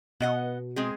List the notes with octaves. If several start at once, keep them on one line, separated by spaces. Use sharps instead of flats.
B2 B3 D#5 F#5
G#3 C4 G#4